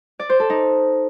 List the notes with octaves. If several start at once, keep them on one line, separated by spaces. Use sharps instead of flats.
D5
C5
A4
D#4